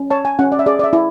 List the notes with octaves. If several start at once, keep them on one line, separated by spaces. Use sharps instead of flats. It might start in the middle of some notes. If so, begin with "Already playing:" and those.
Already playing: C#4
C#5 A5
G#5
C#4 F#5
D5
E5
G#4 D5
D5
E5
E4